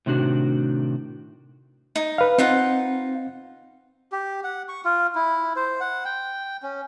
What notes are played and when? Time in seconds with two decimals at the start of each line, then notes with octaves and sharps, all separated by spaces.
0.06 A2 C3 D#3 D4 F#4
1.96 D#4
2.18 B4 F5
2.38 C4 D#4 F4 F#5
4.12 G4
4.44 F#5
4.68 C#6
4.85 F4
5.15 E4
5.56 C5
5.80 F#5
6.05 G5
6.63 C#4